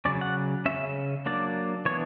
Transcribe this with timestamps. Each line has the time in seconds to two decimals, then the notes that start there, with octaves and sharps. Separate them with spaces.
0.05 C#3 F#3 C#4 D5
0.21 F#5
0.66 C#3 G3 C#4 E5
1.26 F#3 A#3 D4 D5
1.85 E3 B3 D4 C#5